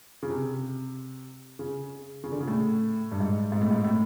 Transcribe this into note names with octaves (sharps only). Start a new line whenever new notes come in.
C#3
C3
C#3
C#3
D3
C#3
A2
G2
G#2
G#2
A2
G#2
A2